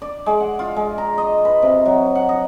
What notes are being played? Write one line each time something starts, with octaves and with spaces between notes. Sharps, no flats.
D5
G#3
F#5
F4
G#3
A#5
D#5
B4
C3
F#3
F#5
D#5